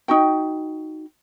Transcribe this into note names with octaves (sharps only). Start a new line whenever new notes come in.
D#4 F#4 G5